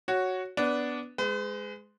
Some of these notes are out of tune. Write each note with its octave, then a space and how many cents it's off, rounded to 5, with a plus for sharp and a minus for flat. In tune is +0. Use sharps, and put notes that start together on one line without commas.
F#4 +0 C#5 +0
B3 +0 D4 -15 B4 +0
G#3 +5 B4 +40